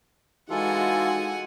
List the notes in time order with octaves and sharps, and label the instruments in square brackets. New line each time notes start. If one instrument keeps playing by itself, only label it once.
[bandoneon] E3 F4 A4 [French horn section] G#3 D#4 F#4 [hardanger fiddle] F#5 G#5